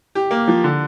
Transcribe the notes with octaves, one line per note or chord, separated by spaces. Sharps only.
G4
A#3
F3
D3